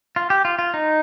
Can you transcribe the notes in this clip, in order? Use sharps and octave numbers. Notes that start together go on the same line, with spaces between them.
F4
G4
F4
F4
D#4